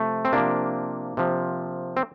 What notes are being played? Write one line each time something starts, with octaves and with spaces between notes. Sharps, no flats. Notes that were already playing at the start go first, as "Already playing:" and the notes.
Already playing: C3 F3 A3
C4
C3 F3 A#3 D4
C3 F3
C4